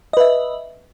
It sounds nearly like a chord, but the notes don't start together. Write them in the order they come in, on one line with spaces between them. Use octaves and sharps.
D#5 B4 E5